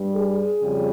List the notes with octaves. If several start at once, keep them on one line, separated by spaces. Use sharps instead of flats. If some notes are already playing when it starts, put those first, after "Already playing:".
Already playing: G2 G3
G#4
F2 C#3 G3